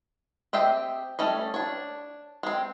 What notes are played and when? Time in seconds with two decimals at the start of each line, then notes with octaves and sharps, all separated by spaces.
0.53 C4 G4 D#5 E5 G5
1.19 G3 A3 C#4 D#5
1.54 D4 C#5
2.43 G#3 C4